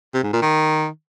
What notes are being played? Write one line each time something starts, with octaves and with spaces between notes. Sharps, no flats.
C3
G#2
A#2
D#3